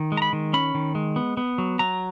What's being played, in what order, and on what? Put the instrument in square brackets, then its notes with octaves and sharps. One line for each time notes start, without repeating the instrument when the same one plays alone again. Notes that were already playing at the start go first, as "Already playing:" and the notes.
Already playing: [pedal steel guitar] D#3
G#3
A#5
B5
D#3
C#4 B5
D#3
G#3
B3
B3
F#3
F#3 A#5